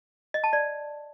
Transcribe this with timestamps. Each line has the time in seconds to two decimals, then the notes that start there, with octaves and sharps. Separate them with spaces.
0.34 D#5
0.44 A5
0.53 D5